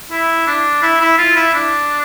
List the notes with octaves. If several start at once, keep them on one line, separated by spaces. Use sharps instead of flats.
E4
D4
E4
E4
F4
E4
D4